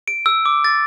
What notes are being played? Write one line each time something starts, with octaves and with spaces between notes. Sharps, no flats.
D7
E6
D6
A6